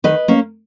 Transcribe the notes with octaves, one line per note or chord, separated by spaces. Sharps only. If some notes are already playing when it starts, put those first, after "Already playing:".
D#3 B4 D#5
A#3 C#4